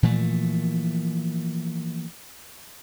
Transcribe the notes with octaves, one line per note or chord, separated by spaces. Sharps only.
A#2 E3 F3 A3